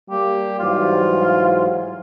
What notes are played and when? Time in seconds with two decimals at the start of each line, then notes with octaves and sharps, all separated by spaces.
0.10 G3 A#3 G4
0.59 G#2 E3 F#3 F4